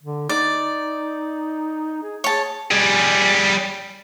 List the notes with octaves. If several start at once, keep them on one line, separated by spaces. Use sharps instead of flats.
D3
D#4 D5
G#4
G#4 C#5 A5
G3 G#4